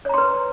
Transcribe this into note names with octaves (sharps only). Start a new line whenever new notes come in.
B4 C#5 A#5 C6